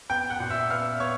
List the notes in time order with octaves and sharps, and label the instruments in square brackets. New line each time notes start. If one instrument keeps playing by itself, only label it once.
[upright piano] B3 G5 G6
F#5 F#6
A#2
E5 E6
B3 F5 F6
B3 C#5 C#6